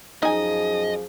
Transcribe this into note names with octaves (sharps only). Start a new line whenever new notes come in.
F#2 F3 D#4 G#4 D#5 G#5